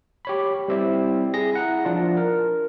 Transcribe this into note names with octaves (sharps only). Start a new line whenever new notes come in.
G4 C#5 B5
G3 C4 E4
G#4 A#6
E4 F#5 A#5
F3 D4 F4
A#4